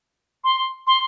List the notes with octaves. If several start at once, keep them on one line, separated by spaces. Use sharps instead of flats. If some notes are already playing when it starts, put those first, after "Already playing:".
C6
C6